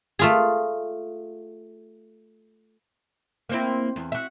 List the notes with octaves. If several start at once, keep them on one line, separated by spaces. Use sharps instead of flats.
A3 F4 G#4
A#3 C4 E4
E2
F#4 E5